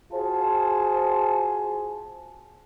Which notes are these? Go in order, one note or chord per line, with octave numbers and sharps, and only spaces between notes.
F4 F#4 G#4 C5 G#5 A5